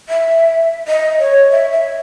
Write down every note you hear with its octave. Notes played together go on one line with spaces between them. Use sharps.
E5
D#5
C#5
E5
E5